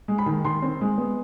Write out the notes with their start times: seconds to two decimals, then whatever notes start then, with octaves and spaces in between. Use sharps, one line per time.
0.08 G#3
0.18 B5
0.26 D#3
0.44 D#3 C6
0.62 C4
0.81 G#3
0.98 B3